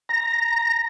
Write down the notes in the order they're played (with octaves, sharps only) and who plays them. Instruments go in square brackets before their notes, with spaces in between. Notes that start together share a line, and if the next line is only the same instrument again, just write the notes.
[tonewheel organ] A#5